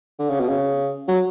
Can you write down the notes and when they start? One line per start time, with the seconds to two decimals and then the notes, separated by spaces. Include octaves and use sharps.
0.19 D3
0.30 C#3
0.40 B2
0.49 C#3
1.08 F#3